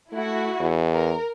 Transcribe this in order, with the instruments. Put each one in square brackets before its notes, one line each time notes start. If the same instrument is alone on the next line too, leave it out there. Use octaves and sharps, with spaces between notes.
[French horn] A3 [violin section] E4 F#4
[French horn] E2
[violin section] A#4